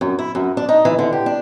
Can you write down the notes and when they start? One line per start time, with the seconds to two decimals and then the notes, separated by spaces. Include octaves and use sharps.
0.01 F#2
0.19 E4
0.35 F#2
0.57 D4
0.69 D#4
0.85 E3
0.99 D3
1.13 G4
1.26 D4